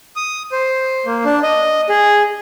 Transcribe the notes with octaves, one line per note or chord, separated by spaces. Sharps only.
D#6
C5
A#3
D4
D#5
G#4